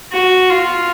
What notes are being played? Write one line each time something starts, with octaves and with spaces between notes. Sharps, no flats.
F#4
F4